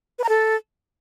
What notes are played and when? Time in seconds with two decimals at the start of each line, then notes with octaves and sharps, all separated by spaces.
0.19 B4
0.24 A#5
0.29 A4